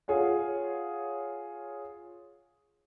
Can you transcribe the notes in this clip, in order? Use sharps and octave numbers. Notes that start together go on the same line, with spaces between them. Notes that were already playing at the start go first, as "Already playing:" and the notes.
F4 G#4 C#5 F#5